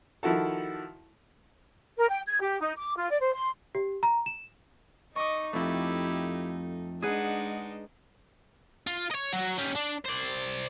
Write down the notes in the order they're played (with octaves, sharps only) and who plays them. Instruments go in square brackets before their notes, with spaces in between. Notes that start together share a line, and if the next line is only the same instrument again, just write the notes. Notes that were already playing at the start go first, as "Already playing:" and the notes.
[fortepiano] D#3 F3 E4 F#4 A4
[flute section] A#4
G5
G#6
G4
D#4
D6
F4
D5
C5
C6
[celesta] G4
A#5
E7
[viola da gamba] D#4 [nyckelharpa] D#5 [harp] C#6 D6
[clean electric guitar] F2 A3 [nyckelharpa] E4 G4
[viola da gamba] G#3 D4 D#4 [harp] G#4 B4 [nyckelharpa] F#5
[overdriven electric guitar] F4
C#5 D#5
F#3 F#4
C#4 G4
D4
C5 D5